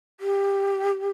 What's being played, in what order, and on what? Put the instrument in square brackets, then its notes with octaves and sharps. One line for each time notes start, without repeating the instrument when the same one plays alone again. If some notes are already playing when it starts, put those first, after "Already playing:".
[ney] G4